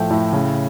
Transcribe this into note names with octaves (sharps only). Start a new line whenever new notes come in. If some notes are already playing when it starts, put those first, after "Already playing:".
Already playing: A2 F3 A3 E5 G5
A2
C#3